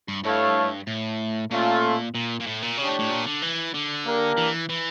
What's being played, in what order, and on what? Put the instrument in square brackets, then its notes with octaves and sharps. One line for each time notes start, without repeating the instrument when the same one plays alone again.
[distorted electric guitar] G2
[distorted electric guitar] G2 [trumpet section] A3 E4 A4 C#5 F5
[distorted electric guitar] A2
[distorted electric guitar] A#2 [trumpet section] A3 C#4 F4 A4
[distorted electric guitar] A#2
A#2
A2
A#2
[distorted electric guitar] C#3 [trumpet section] D4 G4 C#5
[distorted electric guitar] A2
A2
A#2
D3
E3
D3
[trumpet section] A#3 D4 G4 A#4
[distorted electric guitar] E3
E3